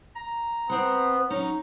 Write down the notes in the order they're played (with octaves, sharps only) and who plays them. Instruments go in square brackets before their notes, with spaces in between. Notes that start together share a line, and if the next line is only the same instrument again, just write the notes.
[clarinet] A#5
[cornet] B3 [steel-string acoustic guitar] C4 C5 F#5
[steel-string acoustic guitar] F#3 C#4 [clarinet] D#4